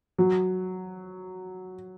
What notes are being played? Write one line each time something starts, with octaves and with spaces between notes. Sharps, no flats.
F#3